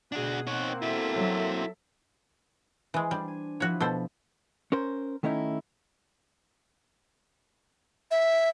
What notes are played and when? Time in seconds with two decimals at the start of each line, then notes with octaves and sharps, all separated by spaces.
0.12 B2 D4 F#4 G#4 F#5
0.47 A#3 C4 D#4 C#5 F#5
0.82 E4 F#4 A4 E5
1.14 F#3
2.94 E3 G#3 C5
3.11 G3 D4
3.28 G#5
3.60 F3 E4 F#4 C#5
3.80 B2 A4 C5
4.72 C#4 A#4 C5
5.23 D#3 A3 C#4 D#4 E4
8.11 E5